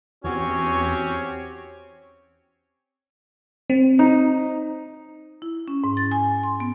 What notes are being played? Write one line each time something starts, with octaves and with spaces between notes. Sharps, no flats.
E2 C4 C#4 F#4 G4 C#5
C4
D#4
E4
C#4
G#2
A6
G#5
C6
B3